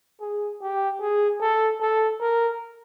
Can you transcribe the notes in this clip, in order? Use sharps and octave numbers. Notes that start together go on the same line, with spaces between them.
G#4
G4
G#4
A4
A4
A#4